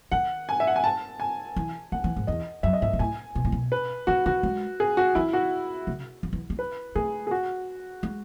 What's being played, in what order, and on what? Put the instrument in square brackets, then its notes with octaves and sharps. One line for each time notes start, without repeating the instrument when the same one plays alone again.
[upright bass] D#3 [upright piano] F#5
[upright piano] G#5
E5
F#5
G#5
A5
G#5
[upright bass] E3
[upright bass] D#3 [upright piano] F#5
[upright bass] E3
G#2
[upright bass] E2 [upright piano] D#5
[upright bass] F#2 [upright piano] E5
[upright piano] D#5
[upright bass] G#2 [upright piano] E5
[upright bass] B2
[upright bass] A2 [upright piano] G#5
[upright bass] B2
A2
B2
[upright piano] B4
[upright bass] D#3 [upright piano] F#4
[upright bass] D#3 [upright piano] F#4
[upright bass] G#3
[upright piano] G#4
F#4
[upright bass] E3 [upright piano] E4
[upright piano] F#4
[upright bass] C#3
D#3
E3
G#3
[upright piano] B4
[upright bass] A3 [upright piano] G#4
[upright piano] G#4
F#4
[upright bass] G#3